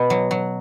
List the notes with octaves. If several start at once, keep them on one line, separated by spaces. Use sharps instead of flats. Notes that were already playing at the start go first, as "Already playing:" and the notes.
Already playing: B2 B3
F#3
F#3